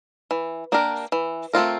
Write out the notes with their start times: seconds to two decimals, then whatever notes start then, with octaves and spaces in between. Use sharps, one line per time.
0.31 E3
0.72 A#3 D4 G4 A#4
1.12 E3
1.53 A3 C4 F4 A#4